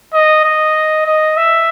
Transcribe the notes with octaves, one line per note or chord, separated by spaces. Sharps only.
D#5
D#5
D#5
E5